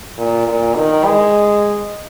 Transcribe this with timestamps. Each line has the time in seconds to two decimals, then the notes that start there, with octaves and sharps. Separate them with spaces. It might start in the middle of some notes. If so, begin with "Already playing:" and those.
0.18 A#2
0.48 A#2
0.76 D#3
1.05 G#3